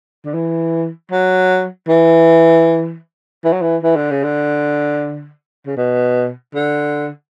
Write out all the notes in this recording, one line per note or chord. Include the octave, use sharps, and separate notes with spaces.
D3
E3
F#3
E3
E3
F#3
E3
E3
D3
C#3
D3
C#3
B2
D3